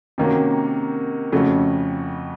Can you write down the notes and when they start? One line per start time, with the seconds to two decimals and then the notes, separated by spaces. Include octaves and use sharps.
0.18 C3 D#3 A#3 C#4 F#4
1.32 F2 C#3 A3 C#4 F#4